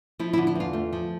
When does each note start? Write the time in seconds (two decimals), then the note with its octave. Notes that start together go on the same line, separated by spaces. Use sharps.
0.19 F3 E4
0.33 E4
0.38 D3
0.47 E4
0.55 E2 F4
0.73 A3
0.93 F3